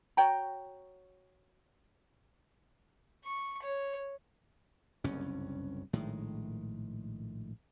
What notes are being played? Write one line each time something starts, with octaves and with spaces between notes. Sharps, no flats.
F#4 C#5 G5 A#5
C#6
C#5
F#1 C2 G2 C#4
A#1 A2 D#3 G#3